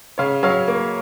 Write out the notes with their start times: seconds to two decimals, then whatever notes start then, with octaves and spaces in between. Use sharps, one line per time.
0.18 C#3 C#5 F5
0.43 F#3 C#5 F5
0.68 A#3